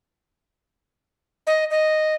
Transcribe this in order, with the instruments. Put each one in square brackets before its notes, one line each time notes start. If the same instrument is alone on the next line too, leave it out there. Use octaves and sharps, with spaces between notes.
[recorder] D#5
D#5